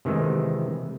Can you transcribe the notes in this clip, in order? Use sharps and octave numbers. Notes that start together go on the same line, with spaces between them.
C3 D#3 E3 G#3 A3